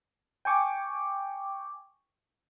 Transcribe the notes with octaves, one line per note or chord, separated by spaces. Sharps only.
G5 G#5 C#6 D6